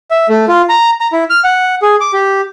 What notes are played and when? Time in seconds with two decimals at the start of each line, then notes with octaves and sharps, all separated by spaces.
0.11 E5
0.29 A3
0.48 F4
0.69 A#5
1.00 A#5
1.12 E4
1.30 F6
1.44 F#5
1.82 G#4
2.01 D6
2.13 G4